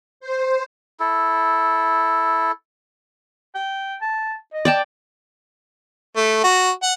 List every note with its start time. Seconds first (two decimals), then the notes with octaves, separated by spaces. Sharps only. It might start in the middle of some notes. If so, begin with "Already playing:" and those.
0.20 C5
1.00 E4 A4
3.55 G5
4.01 A5
4.53 D#5
4.65 D5 G5 A5
6.16 A3
6.43 F#4
6.82 F#5